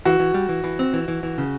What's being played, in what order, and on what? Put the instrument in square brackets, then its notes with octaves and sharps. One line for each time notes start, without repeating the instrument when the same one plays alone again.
[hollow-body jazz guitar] E3 [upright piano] F#4
[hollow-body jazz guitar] E3
G3
E3
E3
C4
E3
E3
E3
C#3